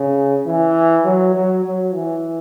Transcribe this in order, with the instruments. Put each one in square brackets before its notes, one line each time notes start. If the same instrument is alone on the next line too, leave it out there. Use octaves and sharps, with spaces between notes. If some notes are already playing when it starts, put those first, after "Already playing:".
Already playing: [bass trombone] C#3
E3
F#3
F#3
F#3
E3